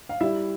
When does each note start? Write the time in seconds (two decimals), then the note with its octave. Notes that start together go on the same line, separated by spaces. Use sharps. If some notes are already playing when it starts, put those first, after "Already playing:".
0.09 F5
0.21 G3 E4 E5